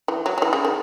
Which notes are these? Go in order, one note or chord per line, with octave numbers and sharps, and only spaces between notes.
E3
F#3
F#3
E3
C#3
D#3